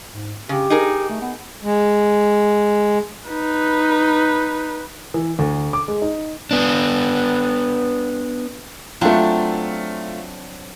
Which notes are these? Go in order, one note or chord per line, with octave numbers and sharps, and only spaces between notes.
G#2
C#3 G4
D#4 G#4 A#4
A3
B3
G#3
D#4 B4
E3
D2
D6
G#3
D#4
B3 D4
F#3 A3 C4 D4 F4